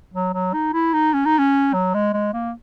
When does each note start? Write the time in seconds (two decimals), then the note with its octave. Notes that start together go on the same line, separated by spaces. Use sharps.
0.14 F#3
0.34 F#3
0.54 D#4
0.73 E4
0.94 D#4
1.13 C#4
1.25 D#4
1.38 C#4
1.74 F#3
1.94 G#3
2.13 G#3
2.33 A#3